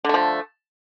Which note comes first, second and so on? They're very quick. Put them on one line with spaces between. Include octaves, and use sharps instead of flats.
D3 A3 F3